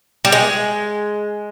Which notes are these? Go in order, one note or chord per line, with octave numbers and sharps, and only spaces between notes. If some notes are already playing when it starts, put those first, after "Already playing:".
G3
G#3